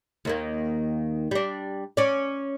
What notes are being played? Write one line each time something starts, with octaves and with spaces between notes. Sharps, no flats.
D#2 D#3 A#3
G3 D4
C#4 D5